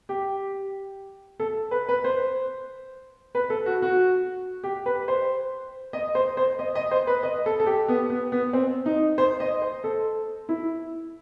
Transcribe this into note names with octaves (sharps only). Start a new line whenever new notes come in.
G4
A4
B4
B4
C5
B4
A4
F#4
F#4
G4
B4
C5
D#5
C5
C5
D#5
D#5
C5
B4
D#5
A4
A4
G4
B3
B3
B3
C4
D#4
C5
C5
D#5
C5
A4
E4